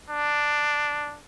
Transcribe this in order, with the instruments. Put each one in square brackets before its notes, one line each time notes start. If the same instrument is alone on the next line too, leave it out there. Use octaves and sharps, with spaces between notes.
[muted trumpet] D4